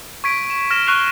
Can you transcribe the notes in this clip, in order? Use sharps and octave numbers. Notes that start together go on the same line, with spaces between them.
C#6 G#6 B6 D7
E7
F6 A#6 E7
C#6 F#6 C7 F7 G7